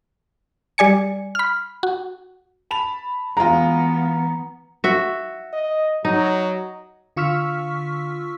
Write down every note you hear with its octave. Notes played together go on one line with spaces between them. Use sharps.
G3 D5 G#5 C#7
B5 F6
F#4
A5 B5 F7
E3 G#3 B3 F4 A#5
F#4 E5
D#5
F#3 D#4
D3 F4 C#6 E6 F6 B6